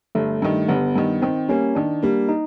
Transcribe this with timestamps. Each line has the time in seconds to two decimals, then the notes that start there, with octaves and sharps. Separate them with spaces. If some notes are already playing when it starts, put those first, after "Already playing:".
0.15 G1 A3
0.42 G2 D#3
0.68 G1 B3
0.96 G2 D#3
1.22 D#3 C4
1.48 G3 A#3 C#4
1.75 D#3 D4
2.03 G3 A#3
2.29 D#4